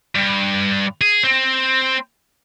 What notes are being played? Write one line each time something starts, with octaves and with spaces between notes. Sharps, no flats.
G2
G#4
C4